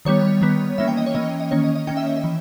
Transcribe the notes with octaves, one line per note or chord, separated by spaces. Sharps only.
D#3 G3 B3 C#5
D#3 G3 B3
E3 A#3 C#4 E5
G5
D#5
C#5
E3 A#3 C#4 D#5
D#5
D#3 A#3 C#4 C#5
D#5
D#5
D#3 A#3 C#4 G5
E5
D#5
E5
E3